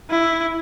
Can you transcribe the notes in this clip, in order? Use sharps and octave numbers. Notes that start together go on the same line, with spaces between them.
E4